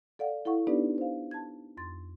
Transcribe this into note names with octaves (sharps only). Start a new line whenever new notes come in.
A4 D5 F5 F#5
E4 A4 F5 F#5 C#6
B3 D4 D#4 G4 B4 D5
C5 F5
A5 G#6
F2 C6 A6